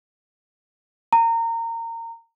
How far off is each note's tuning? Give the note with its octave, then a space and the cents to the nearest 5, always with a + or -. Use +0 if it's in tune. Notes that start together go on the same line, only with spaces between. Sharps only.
A#5 -25